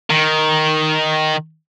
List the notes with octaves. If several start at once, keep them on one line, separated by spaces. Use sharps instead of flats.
D#3